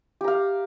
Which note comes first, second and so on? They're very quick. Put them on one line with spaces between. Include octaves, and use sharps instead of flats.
G4 A#5 F5